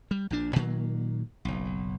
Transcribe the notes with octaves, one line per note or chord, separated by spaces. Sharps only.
G3
A#1 A#2 D4
A#2 D#3 F#3 A#3
F#1 B1